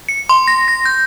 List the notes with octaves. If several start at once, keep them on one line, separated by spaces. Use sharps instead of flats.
C#7
C6
A#6
A#6
G6